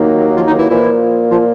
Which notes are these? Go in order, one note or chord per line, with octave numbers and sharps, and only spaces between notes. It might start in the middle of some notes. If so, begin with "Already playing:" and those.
Already playing: D#2 D#3 F#3 A#3
F3 F4
D#3 D#4
E3 E4
A#2 E3 F3 A#3 E4
F3 F4